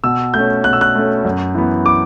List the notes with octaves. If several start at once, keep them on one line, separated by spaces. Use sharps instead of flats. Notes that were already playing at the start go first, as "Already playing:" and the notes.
B2 E6
A3 C#4 G6
B2 F#6
E6
F#6
A3 C#4
F#2
E3 B3
D6